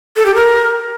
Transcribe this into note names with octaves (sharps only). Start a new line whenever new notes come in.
A4
G4
A#4